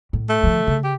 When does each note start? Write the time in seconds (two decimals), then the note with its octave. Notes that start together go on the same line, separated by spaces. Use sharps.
0.13 A2
0.29 A3
0.43 D3 F3
0.67 C#3
0.84 G4